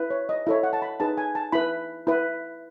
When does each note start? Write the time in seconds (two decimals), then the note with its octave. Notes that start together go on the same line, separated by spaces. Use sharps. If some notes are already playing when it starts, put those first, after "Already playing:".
Already playing: E4 B4
0.10 C#5
0.29 D#5
0.47 E4 A4 C#5 E5
0.63 F#5
0.73 A5
0.82 B5
1.00 D#4 G#4 B4 A5
1.17 G#5
1.35 A5
1.52 E4 B4 B5
2.07 E4 B4